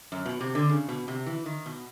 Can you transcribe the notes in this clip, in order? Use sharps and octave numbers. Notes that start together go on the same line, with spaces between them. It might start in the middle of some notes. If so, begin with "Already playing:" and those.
F#2
B2
C3
D3
C#3
B2
C3
E3
D#3
B2